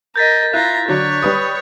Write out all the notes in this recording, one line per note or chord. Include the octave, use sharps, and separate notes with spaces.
A#4 D#5 G6 A6 B6
E4 F4 A#5 F#6
D3 F#3 D4 C#5
G3 B4 D#6